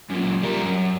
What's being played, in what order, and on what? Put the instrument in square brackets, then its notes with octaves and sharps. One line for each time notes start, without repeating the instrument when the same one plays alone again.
[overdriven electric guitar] F#2 A#2
G3 A#4
F#2